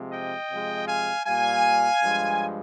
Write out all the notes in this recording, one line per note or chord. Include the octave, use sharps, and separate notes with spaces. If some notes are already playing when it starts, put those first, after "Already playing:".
Already playing: C3 F3 G#3
D#5 G5
C3 F3 G#3
F5 G#5
A#2 G3 F5 G#5
G2 F3 G#3